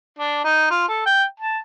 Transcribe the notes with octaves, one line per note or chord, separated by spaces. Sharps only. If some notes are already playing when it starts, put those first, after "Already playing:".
D4
D#4
F4
A4
G5
A5